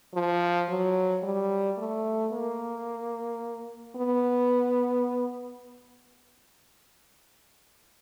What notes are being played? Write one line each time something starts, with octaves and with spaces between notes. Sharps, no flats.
F3
F#3
G3
A3
A#3
B3